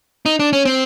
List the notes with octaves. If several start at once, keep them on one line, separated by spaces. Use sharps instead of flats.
D#4
D4
C#4
C4